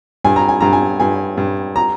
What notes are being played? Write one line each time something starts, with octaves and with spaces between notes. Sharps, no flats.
G2 G#5
A#5
G#5
G2 A#5
G#5
G2 G#5
G2
A#5